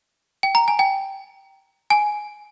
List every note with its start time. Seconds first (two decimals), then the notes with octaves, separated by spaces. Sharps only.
0.43 G5
0.55 A#5
0.68 G#5
0.79 G5
1.90 G#5